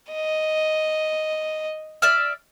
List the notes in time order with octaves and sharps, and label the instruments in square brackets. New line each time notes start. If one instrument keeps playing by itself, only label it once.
[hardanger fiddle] D#5
[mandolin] D5 E5 F6